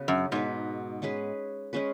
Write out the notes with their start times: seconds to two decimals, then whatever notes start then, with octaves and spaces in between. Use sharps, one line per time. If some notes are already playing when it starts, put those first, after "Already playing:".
Already playing: C#3 B3 F#4 B4
0.08 F#2
0.31 G#2 B2 G#3 D#4 B4
1.02 G#3 C#4 G#4 B4
1.73 G#3 C#4 G#4 B4